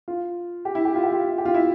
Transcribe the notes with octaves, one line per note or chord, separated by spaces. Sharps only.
F4
G4
E4
G4
F4
G4
F4
G4
F4
E4